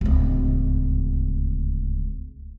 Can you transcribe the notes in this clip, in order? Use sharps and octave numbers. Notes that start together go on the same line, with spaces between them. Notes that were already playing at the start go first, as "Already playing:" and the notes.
D1 C#2